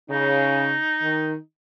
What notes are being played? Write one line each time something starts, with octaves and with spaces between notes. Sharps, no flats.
C#3 D#4
D#3